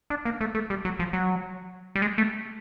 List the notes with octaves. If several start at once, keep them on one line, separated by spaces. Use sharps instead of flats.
D4
A#3
A3
A3
G3
F#3
F3
F#3
G3
G#3
A3